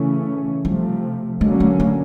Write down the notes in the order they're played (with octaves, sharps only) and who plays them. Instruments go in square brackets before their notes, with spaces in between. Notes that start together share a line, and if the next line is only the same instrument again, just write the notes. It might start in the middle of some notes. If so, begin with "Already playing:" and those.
Already playing: [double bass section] C#3 E3 A3 C#4
[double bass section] C3 F3 A3 [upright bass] G3
[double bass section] D3 F#3 A#3 C#4 [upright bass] G#3
[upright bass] A3
A3